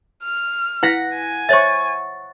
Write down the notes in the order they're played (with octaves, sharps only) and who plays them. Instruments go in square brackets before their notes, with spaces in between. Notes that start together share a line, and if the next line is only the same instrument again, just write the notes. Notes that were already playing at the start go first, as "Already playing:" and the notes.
[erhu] F6
[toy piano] E4 B4 [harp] F#5 A#6 B6
[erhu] G#5
[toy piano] C5 C#5 E5 [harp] C#6 A6